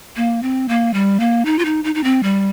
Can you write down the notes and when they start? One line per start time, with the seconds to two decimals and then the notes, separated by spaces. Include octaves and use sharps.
0.16 A#3
0.43 C4
0.68 A#3
0.94 G3
1.20 A#3
1.45 D#4
1.59 F4
1.65 D#4
1.84 D#4
1.95 D#4
2.04 C4
2.23 G3